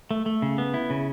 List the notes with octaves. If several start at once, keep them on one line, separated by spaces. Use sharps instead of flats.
A3
A3
C#3
B3
E4
C#3